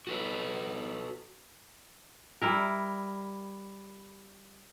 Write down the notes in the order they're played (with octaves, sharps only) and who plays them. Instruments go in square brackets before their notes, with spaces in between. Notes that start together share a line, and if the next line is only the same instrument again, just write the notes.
[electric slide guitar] F#4 A4 B4
[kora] G3 E4 A#4